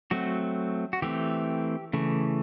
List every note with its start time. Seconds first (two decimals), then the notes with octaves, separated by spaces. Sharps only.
0.11 F#3 A3 C4 F#4
0.93 F#4
1.02 E3 A3 C4 G4
1.93 C#3 E3 A3